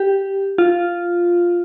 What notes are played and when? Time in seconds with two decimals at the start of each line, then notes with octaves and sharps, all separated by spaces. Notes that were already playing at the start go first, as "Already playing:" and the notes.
Already playing: G4
0.58 F4